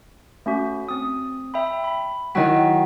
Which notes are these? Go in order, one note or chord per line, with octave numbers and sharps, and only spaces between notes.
A3 C#4 F#4
C4 D#6
E5 G5 B5
B5
D#3 F#3 E4 G5 B6